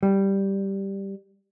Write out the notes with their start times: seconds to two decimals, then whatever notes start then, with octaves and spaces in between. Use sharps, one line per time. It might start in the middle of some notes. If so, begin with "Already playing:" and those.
0.03 G3